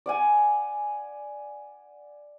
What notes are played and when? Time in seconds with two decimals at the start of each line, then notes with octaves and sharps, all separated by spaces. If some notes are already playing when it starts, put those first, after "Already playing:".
0.06 D5 F#5 G#5